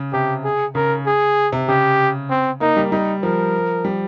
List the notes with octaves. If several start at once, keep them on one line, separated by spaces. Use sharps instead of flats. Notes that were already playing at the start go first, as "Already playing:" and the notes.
Already playing: C#3
C3 G4
G#4
C#3 A#4
G#4
C3
C#3 G4
C4
A#3 D#4
G3
G3 D#4
F3 A#4
G3